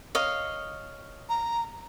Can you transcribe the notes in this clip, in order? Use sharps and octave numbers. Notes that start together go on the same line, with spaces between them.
C#5 D#5 F5
A#5